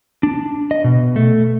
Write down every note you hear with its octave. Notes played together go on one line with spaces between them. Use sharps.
D4
D#5
B2
A3